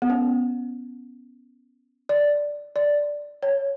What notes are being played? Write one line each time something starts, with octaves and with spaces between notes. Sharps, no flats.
B3
C#4
D5
D5
C#5